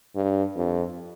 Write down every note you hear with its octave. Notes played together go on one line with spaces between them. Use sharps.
G2
F2